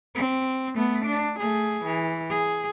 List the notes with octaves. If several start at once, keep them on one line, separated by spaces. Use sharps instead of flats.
C4
A3 B3
D4
A3 G#4
E3
G#4